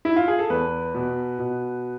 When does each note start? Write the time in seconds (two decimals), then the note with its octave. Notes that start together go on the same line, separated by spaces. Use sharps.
0.05 E4
0.16 F4
0.28 G#4
0.39 A4
0.50 E2 B4
0.95 B2
1.39 B2